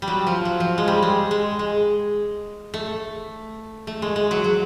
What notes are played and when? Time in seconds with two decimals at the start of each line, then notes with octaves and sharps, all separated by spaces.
0.02 G3
0.08 F#3
0.27 F3
0.45 F#3
0.60 F3
0.78 G#3
0.88 G3
1.02 G#3
1.31 G#3
1.59 G#3
2.74 A3
3.87 A3
4.02 G#3
4.16 G#3
4.31 F#3
4.44 F#3